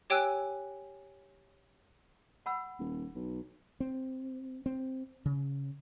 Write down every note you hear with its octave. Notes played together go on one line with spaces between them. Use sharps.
G4 C#5 G5 G#5 E6 F#6
F#5 B5 E6
D#1
B1
C4
C4
C#3